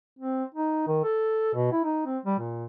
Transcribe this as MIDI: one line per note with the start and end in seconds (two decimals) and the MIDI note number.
0.19 0.44 60
0.55 0.83 63
0.88 1.02 51
1.04 1.52 69
1.54 1.70 47
1.72 1.82 64
1.85 2.02 63
2.06 2.18 60
2.25 2.37 55
2.39 2.66 46